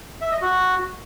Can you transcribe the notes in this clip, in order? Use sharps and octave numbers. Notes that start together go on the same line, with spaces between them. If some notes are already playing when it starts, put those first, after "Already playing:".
E5
D#5
F#4